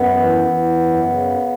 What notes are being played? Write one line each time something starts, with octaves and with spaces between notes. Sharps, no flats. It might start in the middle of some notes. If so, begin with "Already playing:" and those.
Already playing: F#2 B3
E3
E3
F#2
C#3